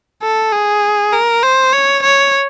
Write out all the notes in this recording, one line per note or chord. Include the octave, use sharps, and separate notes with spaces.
A4
G#4
A#4
C5
C#5
C#5